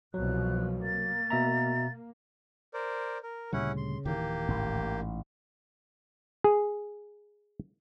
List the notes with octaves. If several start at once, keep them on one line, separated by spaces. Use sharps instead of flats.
C2 B2 F3 F#3 F#6
A#3 A6
B2 E5 A#5
A#4 C5 D5
A#4
D2 A#2 C#3 G3 C#4 E4 F#5
C6
D1 D#3 E3 A#3 G4
A1 G#2
G#4